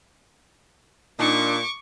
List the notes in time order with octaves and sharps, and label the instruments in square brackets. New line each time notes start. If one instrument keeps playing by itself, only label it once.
[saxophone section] A#2 [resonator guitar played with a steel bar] D4 D#4 [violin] C#6 D6